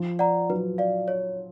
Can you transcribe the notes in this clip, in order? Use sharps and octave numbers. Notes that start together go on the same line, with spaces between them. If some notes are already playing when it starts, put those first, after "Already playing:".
Already playing: F3
D5 F#5 A#5
F#3 B4
D5 F5
C#5